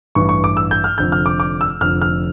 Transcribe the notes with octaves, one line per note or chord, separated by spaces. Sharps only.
A1 G2 E3 C#6
C#6
D6
E6
G6
F6
F1 F2 D3 G6
F6
D6
D6
E6
F1 F2 D3 F6
F6